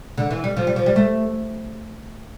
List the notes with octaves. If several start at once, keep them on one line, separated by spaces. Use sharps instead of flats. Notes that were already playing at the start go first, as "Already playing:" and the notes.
D3
E3
G3
F3
G3
F3
G3
A3